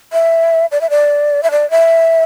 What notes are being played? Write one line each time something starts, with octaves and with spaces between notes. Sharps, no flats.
E5
D5
E5
D5
E5
D5
E5